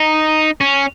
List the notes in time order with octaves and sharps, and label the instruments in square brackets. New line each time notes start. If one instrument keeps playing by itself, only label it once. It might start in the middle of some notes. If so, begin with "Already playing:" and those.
Already playing: [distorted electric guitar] D#4
C#4